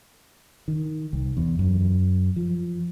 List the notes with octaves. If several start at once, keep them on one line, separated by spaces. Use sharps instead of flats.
D#3
C2
E2
F#2
F3